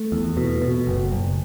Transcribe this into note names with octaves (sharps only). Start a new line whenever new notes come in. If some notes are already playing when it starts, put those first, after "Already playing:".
Already playing: A3
E2
B2
B2
F#1
F#1